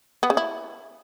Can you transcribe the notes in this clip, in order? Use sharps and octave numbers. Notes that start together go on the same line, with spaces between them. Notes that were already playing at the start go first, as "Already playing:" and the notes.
B3
C#3
E4